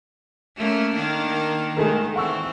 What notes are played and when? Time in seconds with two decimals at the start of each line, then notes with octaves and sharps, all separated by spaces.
0.57 A3 A#3 C#4
0.95 D#3 A#3 D4
1.76 D#3 G#3 A3 A#4
2.16 E3 C4 F#5 C#6 E6